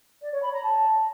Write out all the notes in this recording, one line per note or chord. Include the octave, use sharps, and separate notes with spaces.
D5
C#5
B5
A#5
A5